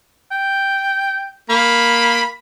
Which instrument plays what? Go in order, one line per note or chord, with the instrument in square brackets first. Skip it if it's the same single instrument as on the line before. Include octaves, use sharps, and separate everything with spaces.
[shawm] G5
[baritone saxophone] A#3 [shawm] B5